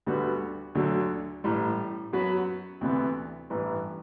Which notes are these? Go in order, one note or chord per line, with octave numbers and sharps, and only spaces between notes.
D2 D3 G3 B3 F#4
D2 D3 F#3
A1 A2 G3
F#2 F#3 B3 F#4 B4
D2 C3 E3 B3
A1 G2 E3